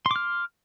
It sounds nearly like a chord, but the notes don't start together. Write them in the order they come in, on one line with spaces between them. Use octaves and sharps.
C6 D6 F6